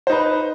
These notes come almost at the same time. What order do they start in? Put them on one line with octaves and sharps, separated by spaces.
C5 D#4 B4